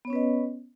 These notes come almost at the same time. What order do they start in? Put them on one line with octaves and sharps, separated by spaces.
B3 C#5 C#4 B4 D#5